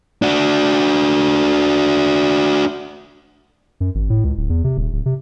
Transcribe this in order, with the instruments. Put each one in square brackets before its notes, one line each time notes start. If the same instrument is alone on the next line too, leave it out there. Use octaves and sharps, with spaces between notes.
[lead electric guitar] D4 F#4
[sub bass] F#2
G#1
A2
C#2
D1
E2
C3
D#1
D1
C3